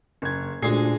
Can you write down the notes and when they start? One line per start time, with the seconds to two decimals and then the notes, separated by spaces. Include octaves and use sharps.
0.22 F#1 G#6
0.63 D2 A#2 G#3 D4 G#4 C7